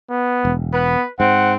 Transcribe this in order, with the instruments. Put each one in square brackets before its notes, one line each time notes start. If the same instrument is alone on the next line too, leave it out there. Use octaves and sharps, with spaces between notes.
[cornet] B3
[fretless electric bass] E1
[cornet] B3 [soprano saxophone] B4
[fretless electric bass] G#2 [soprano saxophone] C4 [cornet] F#5